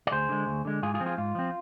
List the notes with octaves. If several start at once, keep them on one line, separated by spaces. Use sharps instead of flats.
D5
D2 G#4 C5
D3 G#3
D2
D3 G#3
G#2 F4 G#4
F4 G#4
F3 C4
F4 G#4
G#2 F4
F3 C4